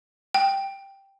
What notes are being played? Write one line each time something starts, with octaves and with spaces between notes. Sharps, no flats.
G5